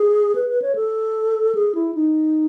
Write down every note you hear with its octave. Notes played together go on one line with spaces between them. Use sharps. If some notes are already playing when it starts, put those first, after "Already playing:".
Already playing: G#4
B4
B4
C#5
A4
G#4
E4
D#4